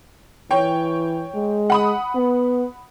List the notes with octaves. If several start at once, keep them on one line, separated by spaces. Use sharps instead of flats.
E3 C#5 G5
G#3
F#5 B5 D#6
B3